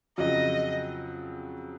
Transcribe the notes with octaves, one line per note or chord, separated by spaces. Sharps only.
F2 C#3 F#3 D#5